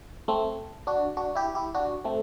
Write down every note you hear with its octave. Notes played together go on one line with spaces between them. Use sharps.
A3 C4
D4 F#4
D4 F#4
E4 G4
E4 G4
D4 F#4
A3 C4